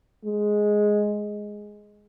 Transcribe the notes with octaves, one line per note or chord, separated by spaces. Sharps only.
G#3